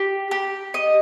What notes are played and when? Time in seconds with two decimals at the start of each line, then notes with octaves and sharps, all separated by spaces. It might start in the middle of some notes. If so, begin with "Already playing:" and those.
Already playing: G4
0.31 G4
0.74 D#5